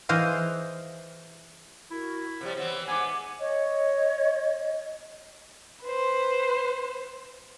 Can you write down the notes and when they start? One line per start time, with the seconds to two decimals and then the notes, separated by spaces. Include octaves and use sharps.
0.09 E3 G#4 C5 D#5 F5
1.91 E4 F#4 A#4 C#6
2.41 C3 F3 G3 C#5
2.57 E3 B3 C4
2.88 G#2 B3 E5 G#5 D6
3.40 C#5 D#5
5.82 B4 C5